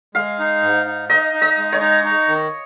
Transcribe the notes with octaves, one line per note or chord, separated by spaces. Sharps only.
G#3 F5
D#4
G#2
D#4
D#4 D#5
D#4
D#5
G#3
C#5
D#4
D#4
D#3